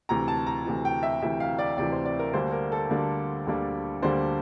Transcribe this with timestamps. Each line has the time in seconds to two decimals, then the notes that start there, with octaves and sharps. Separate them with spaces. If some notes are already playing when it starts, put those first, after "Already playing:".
0.09 D2 C3 E3 A#5
0.28 A5
0.46 A#5
0.66 D2 C3 E3
0.85 G5
1.03 E5
1.22 D2 C3 E3 E5
1.40 F5
1.58 D5
1.78 D2 C3 E3 D5
1.92 C5
2.05 D5
2.19 A#4
2.34 D2 D3 G3 A#3 D4 C5
2.52 A#4
2.72 A4
2.89 D2 D3 G3 A#3 D4
3.46 D2 D3 G3 A#3 D4
4.02 D2 D3 G3 A#3 D4 C5